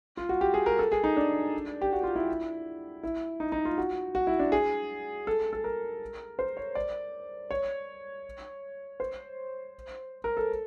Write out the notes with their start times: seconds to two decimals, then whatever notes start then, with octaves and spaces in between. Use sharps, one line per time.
0.17 F4
0.29 F#4
0.41 G4
0.54 G#4
0.66 A#4
0.79 A4
0.92 G#4
1.04 D#4
1.17 D4
1.82 G4
1.93 F#4
2.03 F4
2.16 E4
3.03 E4
3.40 D#4
3.52 D#4
3.65 F4
3.78 F#4
4.15 F#4
4.27 E4
4.39 D4
4.52 G#4
5.27 A4
5.53 A4
5.64 A#4
6.39 C5
6.57 C#5
6.75 D5
7.51 C#5
9.00 C5
10.24 A#4
10.37 A4